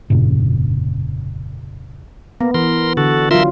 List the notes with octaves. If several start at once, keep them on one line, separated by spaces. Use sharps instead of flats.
F1 G2 A#2 C#3
A#3 B3
E3 A#4 C6
D3 F#4 A4
F#3 F4 A#4 E5 C6